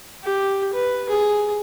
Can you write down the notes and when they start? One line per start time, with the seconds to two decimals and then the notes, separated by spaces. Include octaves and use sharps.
0.24 G4
0.73 B4
1.09 G#4